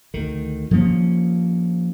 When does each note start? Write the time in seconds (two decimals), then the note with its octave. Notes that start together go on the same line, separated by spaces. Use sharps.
0.14 D2 D#3
0.71 F3 G3 A#3 C#4